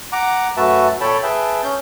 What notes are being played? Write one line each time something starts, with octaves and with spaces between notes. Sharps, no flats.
F#5 A#5 D6
F#2 A3 F#4 B4 E5 A5
A#2 A4 C#5 G5 A5 B5
G#4 B4 E5 G5 A5
C#4 G6